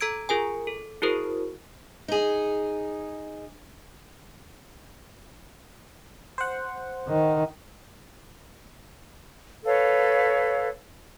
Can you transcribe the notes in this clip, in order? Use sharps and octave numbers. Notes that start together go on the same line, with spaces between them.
A4 A#5 E6 G#6 D7
F4 G#4 A#4 G#5
A4
E4 F#4 G#4 A#4 C5
D#4 G#4
C5 F#5
D#3
A4 B4 C#5 F5